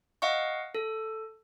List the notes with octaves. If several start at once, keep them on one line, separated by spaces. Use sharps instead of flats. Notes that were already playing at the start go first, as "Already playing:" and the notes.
D#5 F5 F#5 C#6
A4